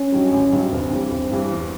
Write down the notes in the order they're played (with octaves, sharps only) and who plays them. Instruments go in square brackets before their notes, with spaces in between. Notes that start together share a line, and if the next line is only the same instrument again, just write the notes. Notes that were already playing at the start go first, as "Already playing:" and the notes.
Already playing: [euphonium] C#4
[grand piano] G2 D#3 F#3
A1
G2 D#3 F#3
[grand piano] G1 [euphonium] C4
[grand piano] G2 E3 G3
G1
G2 E3 G3
E2